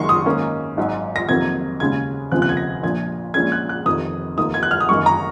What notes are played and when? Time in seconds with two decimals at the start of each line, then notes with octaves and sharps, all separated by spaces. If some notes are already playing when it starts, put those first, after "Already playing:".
Already playing: F#1 F#2 D#3 G#3 C6 C#6
0.09 D#6
0.26 G#2 D#3 A#3 C#4
0.77 G#1 G#2 F#3
1.16 A#6
1.29 F2 C3 D#3 F#3 A#3 G#6
1.80 D#2 C#3 G#3 C#4 G#6
2.32 F1 D#2 C#3 F3 C4 F#6
2.42 F#6
2.49 G#6
2.57 A#6
2.83 A#1 A#2 F3 G#6
3.34 A#1 A#2 G#3 C#4 G#6
3.52 F#6
3.69 F#6
3.86 F1 F2 C3 D#3 D#6
4.37 F1 D#2 D#3 A#3 D#4 D#6
4.54 G#6
4.63 F#6
4.71 F6
4.80 D#6
4.89 F#1 F#2 D#3 C#6
5.06 A#5